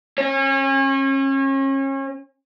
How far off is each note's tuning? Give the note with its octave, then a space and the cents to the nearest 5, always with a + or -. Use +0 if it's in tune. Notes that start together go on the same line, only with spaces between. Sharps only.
C#4 -35